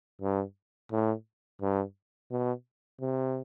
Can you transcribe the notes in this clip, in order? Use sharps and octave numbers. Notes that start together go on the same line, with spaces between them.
G2
A2
G2
B2
C3